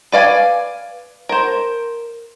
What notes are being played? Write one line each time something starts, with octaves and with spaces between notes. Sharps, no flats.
B4 D5 F5 G#5
A#4 C5